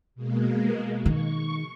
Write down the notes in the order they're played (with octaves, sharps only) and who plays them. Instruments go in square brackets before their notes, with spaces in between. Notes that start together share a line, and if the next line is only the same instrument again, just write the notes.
[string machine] B2 G#3 A#3
[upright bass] D#3 [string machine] C#6